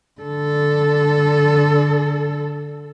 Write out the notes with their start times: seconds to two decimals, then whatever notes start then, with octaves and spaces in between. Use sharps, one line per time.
0.21 D3 A4